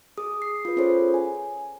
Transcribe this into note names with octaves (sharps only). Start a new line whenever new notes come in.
G#4 D#6
C7
F4 B4
C#4 F4 G#4 A4 C5 C#5
G#5